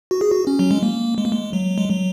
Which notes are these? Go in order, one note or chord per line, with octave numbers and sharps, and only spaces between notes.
F#4
G#4
F#4
C#4
F#3
G#3
A#3
G#3
A#3
G#3
F#3
G#3
F#3